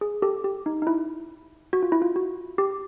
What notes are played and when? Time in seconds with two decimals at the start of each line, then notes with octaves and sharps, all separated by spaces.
0.01 G#4
0.22 G4 A4
0.44 G4
0.66 D#4
0.82 D#4
0.87 E4
1.73 F#4
1.83 F4
1.92 E4
2.02 F4
2.16 F#4
2.58 G4